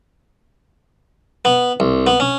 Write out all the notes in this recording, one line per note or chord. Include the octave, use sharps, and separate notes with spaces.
B3
C2
B3
C#4